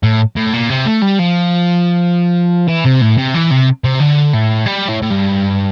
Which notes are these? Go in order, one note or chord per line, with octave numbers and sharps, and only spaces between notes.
A2
A2
A#2
C3
A3
G3
F3
E3
C3
A2
C3
E3
C3
C3
D3
A2
G3
A2
A2
G2